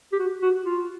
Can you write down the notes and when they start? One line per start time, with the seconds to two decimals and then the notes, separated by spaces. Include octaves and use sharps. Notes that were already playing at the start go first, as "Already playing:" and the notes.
0.12 G4
0.19 F#4
0.42 F#4
0.65 F4